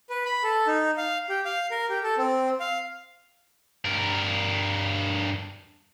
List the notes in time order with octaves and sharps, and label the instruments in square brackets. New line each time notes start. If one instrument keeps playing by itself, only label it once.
[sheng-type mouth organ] B4
B5
A4
D#4
F5
G4
F5
A#4
G4
A4
C4
F5
[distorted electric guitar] G2 A#4